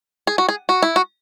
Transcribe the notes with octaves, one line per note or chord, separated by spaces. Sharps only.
G#4
F#4
G#4
F#4
E4
F#4